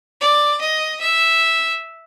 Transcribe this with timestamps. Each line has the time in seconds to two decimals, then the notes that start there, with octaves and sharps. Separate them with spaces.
0.21 D5
0.61 D#5
1.00 E5